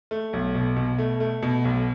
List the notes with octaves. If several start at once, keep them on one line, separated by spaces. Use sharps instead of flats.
A3
B1
B2
B2
A3
A3
B2
B1